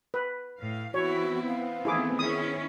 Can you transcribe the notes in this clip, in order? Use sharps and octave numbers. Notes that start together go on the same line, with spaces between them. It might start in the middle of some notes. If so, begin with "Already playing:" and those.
B4
A2 F5
E3 B3 C4 E4 F#4 C#5
F5
D#3 E3 A3 E4 G#4 D6
D#3 C#4 E4 G#4 D#6